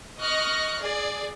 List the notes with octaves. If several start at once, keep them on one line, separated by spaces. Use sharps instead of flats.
D#5 C#6 F6 F#6 A#6
G#4 D5